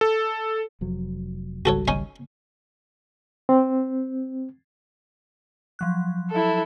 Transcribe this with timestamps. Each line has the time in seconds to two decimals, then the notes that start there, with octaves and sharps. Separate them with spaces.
0.01 A4
0.81 F1 F2 F#3
1.65 G#1 C#2 G3 F#4 A4 C#5
1.88 C#4 D#4 C#5
3.49 C4
5.79 F3 F#3 F#6
6.32 E4 A4